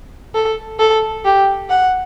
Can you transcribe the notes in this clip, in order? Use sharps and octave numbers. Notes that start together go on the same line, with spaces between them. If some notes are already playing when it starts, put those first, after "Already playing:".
A4
A4
G4
F#5